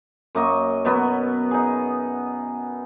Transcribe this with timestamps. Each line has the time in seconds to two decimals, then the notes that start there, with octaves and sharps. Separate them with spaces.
0.35 F#2 A#3 D#5 C#6
0.85 B2 F#3 B3
1.51 D#4 G#4